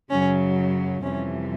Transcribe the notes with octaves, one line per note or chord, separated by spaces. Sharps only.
F#2 C#3 F#3 C#4
F2 C3 E3 G3 C#4